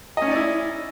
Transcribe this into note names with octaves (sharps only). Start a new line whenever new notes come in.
C#4 D#4 E4 D5 D#5